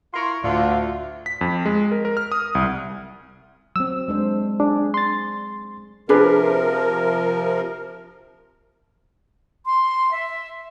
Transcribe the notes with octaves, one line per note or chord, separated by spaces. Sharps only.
E4 F4 A#4 C6 C#6
D2 A2 D3 F4
B6
F2
G#3
A#4
A#4
F6
D#6
C2
F#3 C4 E6
G#3 D4 C5
D4 G#4
C6 A6
C3 F3 D4 G#4 A#4 B4
C6
E5